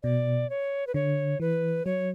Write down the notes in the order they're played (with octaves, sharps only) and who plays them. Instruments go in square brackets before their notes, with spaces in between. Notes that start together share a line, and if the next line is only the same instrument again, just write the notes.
[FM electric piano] B2 [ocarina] D5
[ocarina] C#5
B4
[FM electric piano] D3 [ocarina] C#5
[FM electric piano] E3 [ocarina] B4
[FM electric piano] F#3 [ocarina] C#5